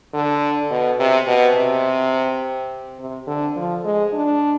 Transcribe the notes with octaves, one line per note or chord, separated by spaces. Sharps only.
D3
B2
C3
B2
C3
C3
D3
F3
G#3
D4